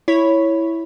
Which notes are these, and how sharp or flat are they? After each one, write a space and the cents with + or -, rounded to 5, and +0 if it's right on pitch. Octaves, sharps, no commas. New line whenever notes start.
E4 +0 C#5 +0 B5 +0